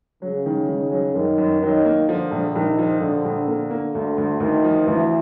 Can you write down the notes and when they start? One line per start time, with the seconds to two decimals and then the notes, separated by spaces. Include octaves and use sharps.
0.22 C#3 F#3
0.46 D#3
0.68 D#3
0.92 F#3
1.15 F#2 D#3
1.38 F#2
1.61 D#3 F#3
1.85 A#3
2.08 D3 F3
2.31 A#1
2.55 A#1 D#3
2.78 F3
3.01 A#1 D3
3.25 A#1
3.48 D3 A#3
3.71 A#3
3.94 D2 D3
4.18 D2
4.40 D2 D#3
4.64 F3
4.87 D2 E3